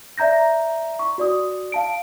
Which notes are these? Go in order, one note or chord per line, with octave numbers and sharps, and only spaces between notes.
D5 E5 A#5 G6 A#6
C#6
F#4 D5 D#6
F5 A5 D7